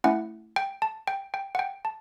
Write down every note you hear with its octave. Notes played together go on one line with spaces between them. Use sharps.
A3 C#4 E4 F#5
G5
A5
G5
G5
F#5
G5
A5